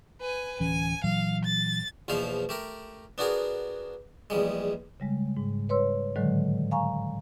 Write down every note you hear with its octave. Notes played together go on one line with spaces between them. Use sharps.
B4 G#5
D1 E3 C#4 G#5
A#2 E3 F#3 F5
A6
A#1 E2 B2 F3 C5 F5
A3 G4 A#4
B3 D4 F#4 G#4 A#4
A#1 E2 G3 G#3
C#3 G3 G#3
G#2
B4 C#5 C6 E6
A2 D3 D#3 F#3 G#3
F5 G#5 A#5 C#6